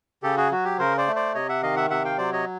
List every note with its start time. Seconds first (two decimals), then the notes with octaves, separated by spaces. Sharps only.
0.23 C#3 G4 A4
0.37 F#4 G#4
0.52 F#3 F#4
0.65 G4
0.79 C#3 A#4 C5
0.97 C5 D5
1.07 A3
1.16 C5 D5
1.34 C3 C#5 D#5
1.49 E5 F#5
1.62 D#3 D#5 F5
1.76 E5 F#5
1.90 C3 E5 F#5
2.05 F5 G5
2.18 F#3 C5 D5
2.33 C#5 D#5